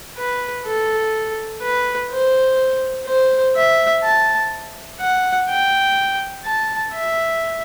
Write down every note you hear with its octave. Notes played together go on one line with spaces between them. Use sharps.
B4
A4
B4
C5
C5
E5
A5
F#5
G5
A5
E5